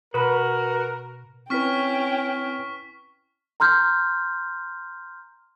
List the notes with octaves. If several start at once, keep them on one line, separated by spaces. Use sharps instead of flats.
B2 F#4 A#4 B4 B5
C4 C#4 E4 B4 G5 C#6 F6 B6
A#5 C6 F6 G6